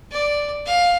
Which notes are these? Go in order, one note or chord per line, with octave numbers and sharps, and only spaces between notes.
D5
F5